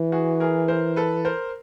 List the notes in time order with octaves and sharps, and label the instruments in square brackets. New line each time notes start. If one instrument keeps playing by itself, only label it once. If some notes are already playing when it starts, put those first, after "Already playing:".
Already playing: [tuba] E3
[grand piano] F#4 G#4
G#4 A#4
A#4 C5
A4 B4
A#4 C5